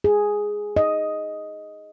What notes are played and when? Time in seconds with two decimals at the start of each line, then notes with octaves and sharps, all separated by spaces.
0.04 G#4
0.77 D#5